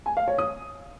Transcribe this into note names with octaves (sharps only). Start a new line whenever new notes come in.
G#5
F5
C#5
D#6